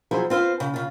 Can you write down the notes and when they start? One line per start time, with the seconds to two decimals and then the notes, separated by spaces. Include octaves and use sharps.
0.11 F3 F#3 E4 G#4 C5 C#5
0.30 C4 F4 B4 C5
0.60 C#3
0.74 C#3 F4